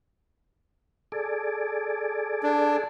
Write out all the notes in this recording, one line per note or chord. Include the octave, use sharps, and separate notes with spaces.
G#4 A4 D5
D4